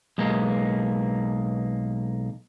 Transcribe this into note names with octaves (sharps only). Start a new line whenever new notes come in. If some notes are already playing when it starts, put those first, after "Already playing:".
B1 G#3 A#3